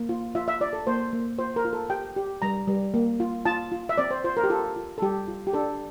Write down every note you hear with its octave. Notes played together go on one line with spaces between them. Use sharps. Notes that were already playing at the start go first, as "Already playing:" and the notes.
Already playing: A#3
F4
F4 E5
E5
F4 D5
A4
A#3 C5
A#3
F4 C5
A#4
F4
A4
G4 G5
G4
G3 A#5
G3
A#3
F4
F4 A5
F4
E5
C4 D5
C5
F4 C5
A#4
G4
F4 A4
F4
A4
G3 G4
F4
G4
D4 A4